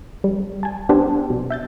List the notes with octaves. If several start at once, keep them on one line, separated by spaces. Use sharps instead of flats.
G3
G#5 A5
B3 D4 G4 C5 D5
B2
E5 G6 A6